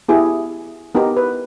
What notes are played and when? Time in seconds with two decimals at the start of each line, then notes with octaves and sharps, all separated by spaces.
0.09 B3 E4 G4 G#4
0.95 B3 D#4 G4 A#4
1.17 B4